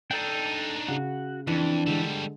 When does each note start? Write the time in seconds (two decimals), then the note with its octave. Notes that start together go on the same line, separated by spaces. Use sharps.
0.11 D4 D#4 A4 G5
0.88 C#3 F#4
1.47 F2 E3 D4
1.87 D3 G3 G#3 A4